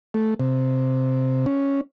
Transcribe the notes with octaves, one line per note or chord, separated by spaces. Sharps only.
A3
C3
C#4